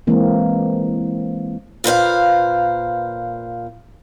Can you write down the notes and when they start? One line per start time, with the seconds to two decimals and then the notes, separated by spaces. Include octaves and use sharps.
0.07 E3 G#3 A#3 C4
1.84 A#2 B4 C5 F5